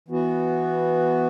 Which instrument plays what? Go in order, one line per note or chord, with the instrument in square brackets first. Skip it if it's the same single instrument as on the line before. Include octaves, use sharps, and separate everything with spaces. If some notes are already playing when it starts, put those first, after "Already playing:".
[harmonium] E3 B3 F#4